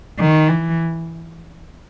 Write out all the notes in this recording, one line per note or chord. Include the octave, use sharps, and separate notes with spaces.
D#3
E3